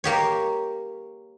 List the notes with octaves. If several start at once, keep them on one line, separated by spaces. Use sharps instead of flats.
A#3 G4 C#5